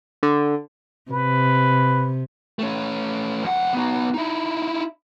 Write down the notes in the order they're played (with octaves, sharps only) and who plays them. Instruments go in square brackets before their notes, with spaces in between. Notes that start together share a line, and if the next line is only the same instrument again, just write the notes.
[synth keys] D3
[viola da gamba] C3 [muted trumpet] B4
[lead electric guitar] A3 C#4
F2 F#5
B3 D#4
D#4 E4